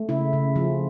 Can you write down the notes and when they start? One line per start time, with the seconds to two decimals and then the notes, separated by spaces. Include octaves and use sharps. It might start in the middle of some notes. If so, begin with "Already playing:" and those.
Already playing: A3
0.09 C#3 E4
0.33 C#3
0.56 F3